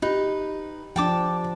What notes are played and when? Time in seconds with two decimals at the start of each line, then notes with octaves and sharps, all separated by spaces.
0.02 D#4 G4 B4
0.96 F3 D4 G5 A5 D6